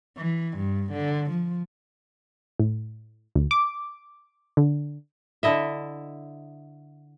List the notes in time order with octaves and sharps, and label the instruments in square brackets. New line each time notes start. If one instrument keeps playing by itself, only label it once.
[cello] E3
G2
D3
F3
[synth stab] A2
D2
D6
D3
[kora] D3 E4 D#5 E5